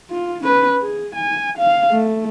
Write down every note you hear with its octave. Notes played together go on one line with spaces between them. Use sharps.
F4
C#4 B4
G#4
G#5
F5
A3